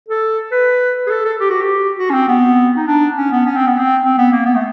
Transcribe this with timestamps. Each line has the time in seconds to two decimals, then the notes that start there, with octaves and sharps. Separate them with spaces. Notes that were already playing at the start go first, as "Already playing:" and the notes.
0.08 A4
0.51 B4
1.06 G#4
1.10 A4
1.25 A4
1.40 G4
1.50 F#4
1.61 G4
1.99 F#4
2.10 C#4
2.14 C4
2.28 B3
2.76 D#4
2.87 D4
3.17 C#4
3.31 B3
3.46 C#4
3.56 C4
3.67 B3
3.78 C4
4.05 C4
4.18 B3
4.32 A#3
4.45 B3
4.56 A3